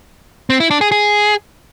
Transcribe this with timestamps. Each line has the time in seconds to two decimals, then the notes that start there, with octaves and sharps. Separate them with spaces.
0.50 C4
0.60 E4
0.71 D4
0.81 G#4
0.92 G#4